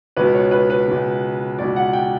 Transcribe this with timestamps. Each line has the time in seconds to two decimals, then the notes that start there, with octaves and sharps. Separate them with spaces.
0.17 C#2 B2 B4
0.34 C#5
0.51 B4
0.70 B4
0.88 C#2 B2
1.59 C#2 B2 D5
1.76 F#5
1.93 G5